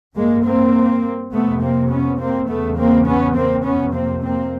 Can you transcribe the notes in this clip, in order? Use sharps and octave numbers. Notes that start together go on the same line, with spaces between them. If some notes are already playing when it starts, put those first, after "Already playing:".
G2 G#3 A#3
A#3 C4
F2 C3 A3 B3
A#3 C4
B3 C#4
A#3 C4
E2 C#3 A3 B3
A#3 C4
B3 C#4
A#3 C4
F2 C3 B3 C#4
A#3 C4
A#3 C4